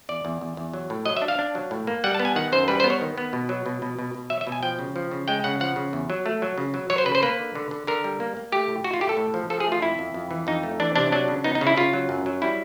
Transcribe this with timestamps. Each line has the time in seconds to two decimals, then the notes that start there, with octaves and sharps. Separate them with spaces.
0.09 E2 D5
0.25 E2
0.41 E2
0.57 E2
0.74 F#3
0.90 A2
1.06 F#3 D#5
1.17 E5
1.22 D4
1.28 F5
1.39 D4
1.55 F#3
1.71 A2
1.87 A#3
2.04 G3 F#5
2.14 A5
2.20 B3
2.25 G#5
2.36 D#3 F#5
2.52 F#2 C5
2.68 G3 B4
2.80 C5
2.84 B3
2.90 C#5
3.01 D#3
3.18 B3
3.33 B2
3.49 F#3
3.66 B2
3.82 B2
3.99 B2
4.15 B2
4.30 F#3 E5
4.41 E5
4.47 B2
4.52 G#5
4.63 F3 G5
4.79 C#3
4.96 F3
5.11 C#3
5.28 G#3 G5
5.44 C#3 F#5
5.60 F3 F#5
5.76 C#3
5.93 E2
6.10 F#3
6.26 A3
6.42 F#3
6.58 C#3
6.74 F#3
6.90 F#3 C#5
6.98 C5
7.06 C#3 B4
7.15 C5
7.23 A#3 B4
7.39 D3
7.55 D3
7.71 D3
7.87 D3 A#4
8.04 G3
8.20 A#3
8.37 A#3
8.52 A3 G4
8.68 A2
8.84 A2 F#4
8.93 F4
9.01 A3 G4
9.09 A4
9.17 A2
9.34 F3
9.50 F3 A4
9.60 G#4
9.66 A3
9.72 F4
9.82 F2 E4
9.99 F2
10.14 F2
10.31 E3
10.47 F2 D#4
10.63 A3
10.80 E3 D4
10.96 C3 D4
11.12 F#3 D4
11.28 C#3
11.44 B3 D#4
11.55 D#4
11.61 C#3
11.67 E4
11.77 C#3 F4
11.93 F#3
12.09 F#2
12.26 F#3
12.42 G3 E4